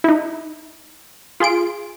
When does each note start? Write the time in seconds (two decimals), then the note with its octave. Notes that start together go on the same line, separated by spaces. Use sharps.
0.04 D#4 E4
1.40 F4 G#4 C6 D7